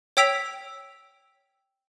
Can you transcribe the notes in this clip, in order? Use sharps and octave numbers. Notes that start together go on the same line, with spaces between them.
C#5 G5 E6 B6 D7 F7